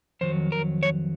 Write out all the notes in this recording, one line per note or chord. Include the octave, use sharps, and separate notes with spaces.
F2 D#3 F#3 C5
A#4
C#5